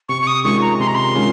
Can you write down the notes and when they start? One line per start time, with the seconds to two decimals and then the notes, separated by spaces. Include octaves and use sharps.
0.09 C3 C#6
0.22 C#6
0.27 D#6
0.44 D#3 G#3 C#4 F4 C#6
0.62 A#5
0.79 C3 C6
0.87 A#5
0.95 C6
1.15 D#3 G#3 C#4 F4